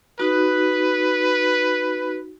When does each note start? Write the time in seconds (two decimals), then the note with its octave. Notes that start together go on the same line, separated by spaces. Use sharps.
0.20 D#4 F#4 B4